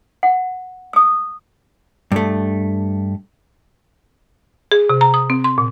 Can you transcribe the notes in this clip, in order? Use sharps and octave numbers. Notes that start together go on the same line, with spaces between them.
F#5
D#6 E6
G2 A3
G#4
C3
A#5
D#6
C4
C6
A#2